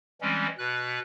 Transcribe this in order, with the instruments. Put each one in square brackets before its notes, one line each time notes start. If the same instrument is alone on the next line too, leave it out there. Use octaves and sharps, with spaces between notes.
[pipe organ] E3 G3 G#3 C4 C#4
B2 B4 F#6